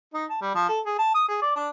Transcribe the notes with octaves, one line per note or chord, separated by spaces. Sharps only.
D#4
A5
G3
F3
A4
G#4
A5
D#6
G#4
D5
D4